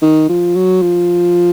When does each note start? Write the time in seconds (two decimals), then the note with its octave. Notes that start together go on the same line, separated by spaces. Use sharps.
0.02 D#3
0.29 F3
0.56 F#3
0.82 F3